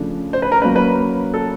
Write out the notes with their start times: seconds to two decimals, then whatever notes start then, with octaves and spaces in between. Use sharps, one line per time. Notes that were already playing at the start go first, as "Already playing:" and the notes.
Already playing: C#3 F3 A3 D4
0.33 C5
0.42 B4
0.52 A#4
0.62 F#3 A#3 C#4 B4
0.76 B4
1.34 A4